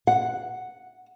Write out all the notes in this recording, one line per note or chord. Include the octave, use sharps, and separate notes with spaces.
F#5